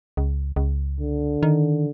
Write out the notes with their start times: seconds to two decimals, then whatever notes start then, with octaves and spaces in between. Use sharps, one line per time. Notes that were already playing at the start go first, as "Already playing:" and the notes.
0.17 C#2
0.56 C#2
1.00 D3
1.43 D#3